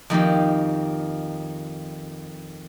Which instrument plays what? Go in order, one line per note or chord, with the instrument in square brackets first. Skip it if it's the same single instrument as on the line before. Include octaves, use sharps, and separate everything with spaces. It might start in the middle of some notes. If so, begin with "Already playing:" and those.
[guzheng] F2 D#3 A#3 G4